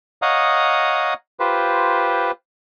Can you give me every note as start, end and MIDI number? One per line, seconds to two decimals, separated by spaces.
0.22 1.14 73
0.22 1.14 75
0.22 1.14 77
0.22 1.14 78
0.22 1.14 82
0.22 1.14 87
1.40 2.31 65
1.40 2.31 67
1.40 2.31 71
1.40 2.31 72